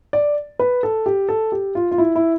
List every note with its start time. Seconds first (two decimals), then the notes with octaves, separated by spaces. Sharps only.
0.13 D5
0.59 B4
0.83 A4
1.06 G4
1.29 A4
1.52 G4
1.75 F4
1.91 F4
1.98 E4
2.16 E4